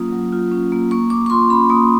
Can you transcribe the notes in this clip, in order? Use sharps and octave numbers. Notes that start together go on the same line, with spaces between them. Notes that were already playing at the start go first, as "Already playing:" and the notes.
Already playing: F#3 A#3 C#4 F4 D#6
F#3
F4
C#4
A#3
A#3 C#6
A#3 D6
C#6
F4 C6
C#4 B5
A#3 D#6